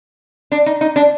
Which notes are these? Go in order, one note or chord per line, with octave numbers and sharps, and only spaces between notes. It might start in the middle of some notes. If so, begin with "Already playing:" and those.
D4
D#4
D#4
D4